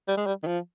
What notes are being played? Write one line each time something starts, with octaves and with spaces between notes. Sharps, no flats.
G3
G#3
G3
D#3
F3